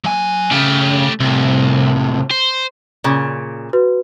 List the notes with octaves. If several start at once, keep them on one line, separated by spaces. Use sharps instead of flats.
F#3 G#5
C#3 A3 G4
C2 A2 C3
C5
A#2 C#3
F#4 B4